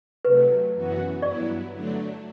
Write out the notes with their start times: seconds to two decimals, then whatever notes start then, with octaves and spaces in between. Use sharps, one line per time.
0.25 C3 F#3 A3 B4
0.74 F#2 E3 B3 F#4
1.22 G2 F#3 B3 E4 D5
1.72 D3 F#3 A3 D4